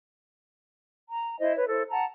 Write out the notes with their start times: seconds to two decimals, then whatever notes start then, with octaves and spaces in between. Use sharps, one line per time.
1.09 A#5
1.39 E4 C5 D#5
1.56 B4 C#5
1.69 E4 A4 C5
1.90 F#5 A5 A#5